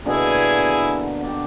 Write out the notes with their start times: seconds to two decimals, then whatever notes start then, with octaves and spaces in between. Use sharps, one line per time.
0.05 B2 D3 A#3 E4 G#4 G#5
1.23 D4 G4